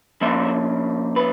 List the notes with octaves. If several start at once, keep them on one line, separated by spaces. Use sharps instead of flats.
F3 A#3 C#4 E5
B4